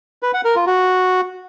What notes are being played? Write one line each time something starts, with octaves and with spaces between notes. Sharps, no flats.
B4
F#5
A#4
F4
F#4